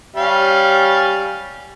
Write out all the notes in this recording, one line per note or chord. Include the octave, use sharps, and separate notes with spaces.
G3 C#4 F5